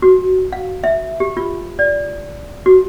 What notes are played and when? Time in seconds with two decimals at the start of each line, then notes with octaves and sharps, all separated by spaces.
0.02 F#4
0.52 F5
0.84 E5
1.20 G4
1.37 F4
1.79 D5
2.66 F#4